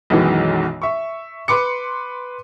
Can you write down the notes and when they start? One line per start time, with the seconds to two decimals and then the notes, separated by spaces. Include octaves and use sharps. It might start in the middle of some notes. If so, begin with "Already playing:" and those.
0.10 B1 F#2 B2 D#3 E3 G#3
0.82 E5 C#6
1.48 B4 C6 D6 C#7